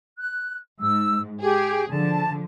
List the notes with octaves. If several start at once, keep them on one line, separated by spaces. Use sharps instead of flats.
F#6
G#2 E6
G4 G#4
D3 F3 A5